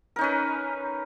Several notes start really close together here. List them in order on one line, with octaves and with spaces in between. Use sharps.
A#4 D#4 C#4 B4